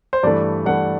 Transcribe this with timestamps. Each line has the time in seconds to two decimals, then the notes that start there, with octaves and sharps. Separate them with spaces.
0.13 C5
0.23 G2 E3 A3 D5
0.66 G2 E3 A3 F#5